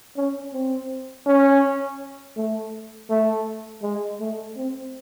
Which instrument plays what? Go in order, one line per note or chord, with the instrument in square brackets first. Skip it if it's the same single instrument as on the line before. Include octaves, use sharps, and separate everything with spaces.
[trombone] C#4
C4
C#4
A3
A3
G#3
A3
C4